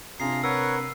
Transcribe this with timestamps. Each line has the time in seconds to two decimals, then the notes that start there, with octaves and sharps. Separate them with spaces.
0.20 C3 D4 F4 G#4 A#5 C7
0.44 A#4 B4 C#5 F#5 E6